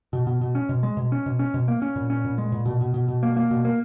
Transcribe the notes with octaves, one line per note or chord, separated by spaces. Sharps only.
B2
B2
B2
C#4
B2
G#3
B2
C#4
B2
C#4
B2
A#3
C#4
A#2
C#4
A#2
G#3
A#2
B2
B2
B2
B2
A#3
A#3
B2
A#3